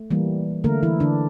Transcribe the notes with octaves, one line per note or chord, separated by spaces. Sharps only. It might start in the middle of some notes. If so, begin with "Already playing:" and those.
Already playing: A3
E3 G3 A#3
D3 A3 A#3 A#4
E3 E4
D3 D4